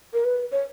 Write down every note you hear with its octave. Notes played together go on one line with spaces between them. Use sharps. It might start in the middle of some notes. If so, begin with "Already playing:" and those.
A#4
B4
C#5